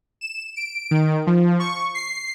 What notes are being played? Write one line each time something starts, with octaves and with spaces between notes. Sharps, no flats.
E7
D7
D#3
F3
C#6
C7